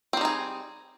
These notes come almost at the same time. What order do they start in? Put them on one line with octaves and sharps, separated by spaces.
C4 G3 D#4 G#4